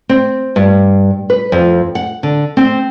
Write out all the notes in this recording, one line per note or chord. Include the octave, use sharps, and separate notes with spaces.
C4
G2
B4
F2
F#5
D3
C4